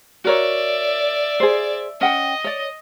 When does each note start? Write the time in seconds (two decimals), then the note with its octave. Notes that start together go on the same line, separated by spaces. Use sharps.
0.24 F#4 A#4 C#5 D5 E5
1.40 G#4 C5
2.01 C#4 D#5 F#5 G5
2.44 C#5 D5